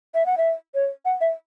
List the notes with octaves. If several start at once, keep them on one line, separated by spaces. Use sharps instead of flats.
E5
F#5
E5
C#5
F#5
E5